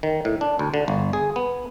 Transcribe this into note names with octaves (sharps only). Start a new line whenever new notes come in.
D#3
A2
D4
D2
D3
G1
G#4
B3